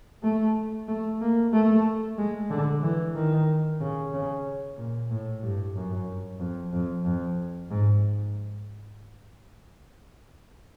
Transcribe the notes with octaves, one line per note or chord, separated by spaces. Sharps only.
A3
A3
A#3
A3
G#3
D3
E3
D#3
C#3
C#3
A#2
A2
G2
F#2
F2
F2
F2
G#2